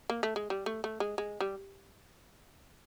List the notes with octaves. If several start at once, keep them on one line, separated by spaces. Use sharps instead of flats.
A#3
A3
G#3
G3
A3
A3
G#3
G#3
G3